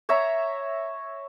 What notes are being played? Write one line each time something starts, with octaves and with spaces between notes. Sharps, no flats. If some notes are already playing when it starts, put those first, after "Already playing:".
C#5 E5 A#5